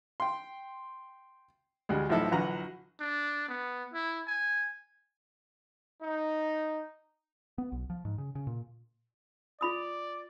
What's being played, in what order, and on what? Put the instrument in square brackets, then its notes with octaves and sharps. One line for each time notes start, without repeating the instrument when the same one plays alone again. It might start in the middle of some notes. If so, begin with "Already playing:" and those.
[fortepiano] G5 C6
D2 G3 G#3
B1 A2 F3 D#4 E4 A4
A#1 D3 E3 F#3 F#5 A#5
[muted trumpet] D4
B3
E4
G#5
[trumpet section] D#4
[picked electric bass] B3
B1
F3
G#2
C#3
C#3
A#2
[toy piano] F4 B5 D#6 [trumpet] D5